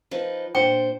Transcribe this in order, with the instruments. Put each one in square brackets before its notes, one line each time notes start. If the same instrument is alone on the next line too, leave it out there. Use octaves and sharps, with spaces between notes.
[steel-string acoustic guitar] F3 D#4 B4
[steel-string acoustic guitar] A#2 D4 C5 [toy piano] G5